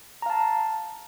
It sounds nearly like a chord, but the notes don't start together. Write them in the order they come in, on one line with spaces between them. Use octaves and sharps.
A#5 F5 A5